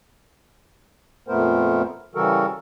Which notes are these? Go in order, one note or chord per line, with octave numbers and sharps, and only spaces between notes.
F2 A#2 A3 B3 A#4 C5
C#3 E3 G3 F#4 A4 A#4